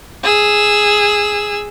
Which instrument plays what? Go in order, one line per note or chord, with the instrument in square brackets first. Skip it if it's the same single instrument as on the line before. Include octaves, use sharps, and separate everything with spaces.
[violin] G#4 E6